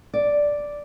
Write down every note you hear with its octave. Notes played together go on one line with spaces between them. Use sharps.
D5